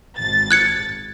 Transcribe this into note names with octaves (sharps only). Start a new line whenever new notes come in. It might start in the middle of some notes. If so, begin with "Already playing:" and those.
G#1 A6
F#6 G#6 C#7